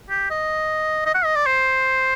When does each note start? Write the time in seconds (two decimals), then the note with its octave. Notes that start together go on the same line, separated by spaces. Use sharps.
0.10 G4
0.31 D#5
1.06 D#5
1.14 F#5
1.25 D#5
1.35 D5
1.46 C5